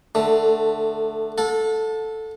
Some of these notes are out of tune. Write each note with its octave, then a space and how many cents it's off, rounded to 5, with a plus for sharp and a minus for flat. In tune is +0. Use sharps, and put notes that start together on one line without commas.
D3 +20 A3 +0
A4 +0 F#5 -40